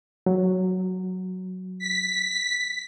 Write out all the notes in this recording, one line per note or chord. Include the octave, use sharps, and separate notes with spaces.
F#3
B6